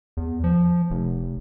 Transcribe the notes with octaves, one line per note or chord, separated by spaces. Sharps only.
E2
F3
F1